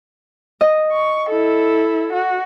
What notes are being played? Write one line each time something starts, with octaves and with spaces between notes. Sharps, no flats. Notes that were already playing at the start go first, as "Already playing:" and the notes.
D#5
C#6
E4 A4
F#4